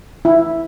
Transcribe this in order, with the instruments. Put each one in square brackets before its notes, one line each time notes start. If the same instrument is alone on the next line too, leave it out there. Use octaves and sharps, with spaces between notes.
[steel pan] E4